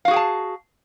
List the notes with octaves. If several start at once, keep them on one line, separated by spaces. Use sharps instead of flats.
F#4 G#4 F5 G5 A5